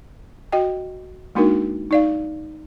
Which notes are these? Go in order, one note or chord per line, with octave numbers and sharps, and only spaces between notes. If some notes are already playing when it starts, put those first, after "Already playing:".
F#4 D#5 G5
G#3 A#3 D4 D#4 F#4 A#4
D#4 D5 F5